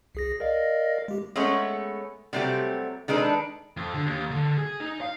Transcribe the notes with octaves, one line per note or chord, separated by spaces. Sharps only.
C2 G#4 A#6
A#4 D5 D#5 F5
G#3 G4
G#3 A3 B3 C#4 C#5
C3 F#3 G3 A3 C4 G4
D#3 G#3 D4 A4 B4
F2
D3
D#2
D3
G#4
D#4
F5